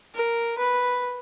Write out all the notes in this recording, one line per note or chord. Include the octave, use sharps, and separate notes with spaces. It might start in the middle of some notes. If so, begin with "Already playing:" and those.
A#4
B4